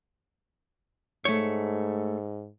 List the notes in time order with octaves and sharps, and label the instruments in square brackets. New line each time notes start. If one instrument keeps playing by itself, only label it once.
[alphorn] G#2 [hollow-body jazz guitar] A3 C#5